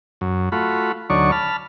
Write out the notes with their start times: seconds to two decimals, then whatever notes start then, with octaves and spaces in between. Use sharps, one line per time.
0.21 F#2
0.52 A3 F4 F#4 B5
1.10 D2 F#3 D#4 C#5 D5 C#6
1.32 A5 B5 F6